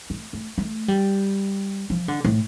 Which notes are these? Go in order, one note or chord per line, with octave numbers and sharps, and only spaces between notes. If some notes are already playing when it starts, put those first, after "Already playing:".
A3
A3
A3
G3
F3
D3
A2